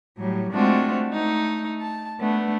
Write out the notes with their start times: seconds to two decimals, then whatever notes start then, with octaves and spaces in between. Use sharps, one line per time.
0.18 A2 F#3 G3
0.52 G#3 A3 C4 D4 F4 F#4
1.12 A3 D#4
1.82 A5
2.20 A3 B3 D4